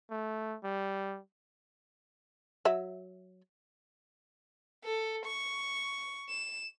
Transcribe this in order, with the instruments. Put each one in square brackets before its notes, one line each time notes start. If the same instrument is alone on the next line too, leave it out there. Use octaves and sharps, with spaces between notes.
[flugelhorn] A3
G3
[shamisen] F#3 E5
[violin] A4
C#6
E7